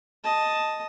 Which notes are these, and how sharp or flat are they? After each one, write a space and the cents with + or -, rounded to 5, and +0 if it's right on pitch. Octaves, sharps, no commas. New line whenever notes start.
D#5 +0 A5 +0